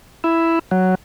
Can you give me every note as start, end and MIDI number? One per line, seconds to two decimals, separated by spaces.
0.24 0.59 64
0.71 0.95 54